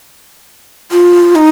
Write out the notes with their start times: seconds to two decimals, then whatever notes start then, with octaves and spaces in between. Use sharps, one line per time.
0.92 F4
1.35 D#4